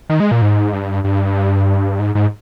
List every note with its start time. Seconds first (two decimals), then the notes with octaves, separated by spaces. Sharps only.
0.10 D#3
0.20 G#3
0.31 A#2
0.42 G#2
0.73 G2
1.04 G2
2.00 G#2
2.15 G#2